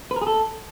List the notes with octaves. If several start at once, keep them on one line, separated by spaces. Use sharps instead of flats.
B4
A#4
G#4
A4